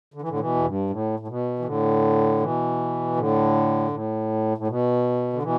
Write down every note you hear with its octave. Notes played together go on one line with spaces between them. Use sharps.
D3
E3
A2 D3
B2 E3
E2
G2
A2
A2
B2
E3
A2 D3
B2 E3
A2 D3
G2
A2
A2
B2
D3
B2 E3